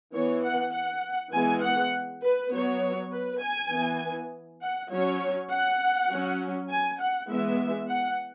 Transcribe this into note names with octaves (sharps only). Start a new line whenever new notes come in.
E3 B3 C#5
F#5
F#5
E3 G#3 B3 G#5
F#5
B4
F#3 B3 C#5
B4
G#5
E3 B3
F#5
F#3 C#4 C#5
F#5
F#3 C#4
G#5
F#5
E3 G#3 B3 E5
F#5